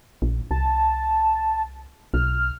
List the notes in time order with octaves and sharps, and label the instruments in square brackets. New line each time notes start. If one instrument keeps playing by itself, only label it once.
[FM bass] A#1
[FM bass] C2 [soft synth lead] A5
[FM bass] B1 [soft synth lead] F6